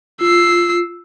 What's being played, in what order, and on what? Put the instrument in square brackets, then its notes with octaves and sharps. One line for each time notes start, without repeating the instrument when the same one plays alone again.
[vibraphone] F4 [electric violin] E6 C7